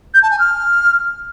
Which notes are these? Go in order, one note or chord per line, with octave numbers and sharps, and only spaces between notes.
G6
A5
G#5
F6